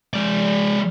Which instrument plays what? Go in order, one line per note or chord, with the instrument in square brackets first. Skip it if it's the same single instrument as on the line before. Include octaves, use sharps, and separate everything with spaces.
[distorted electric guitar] G#3 D5